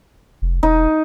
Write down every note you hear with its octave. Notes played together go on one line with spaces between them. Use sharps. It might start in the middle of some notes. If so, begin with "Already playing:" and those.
F1
E1 D#4